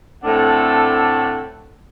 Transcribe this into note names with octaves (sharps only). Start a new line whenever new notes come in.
A2 A3 C4 D4 A4 F#5